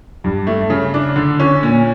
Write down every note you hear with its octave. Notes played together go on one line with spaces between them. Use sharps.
G2
A3
C#3
D4
D3
C#4
A#2